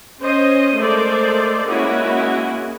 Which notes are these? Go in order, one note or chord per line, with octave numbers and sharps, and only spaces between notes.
C#4 C5 D#5
G#3 A3 A4 A#4 C5 D5
G#3 A#3 C#4 E4 F#4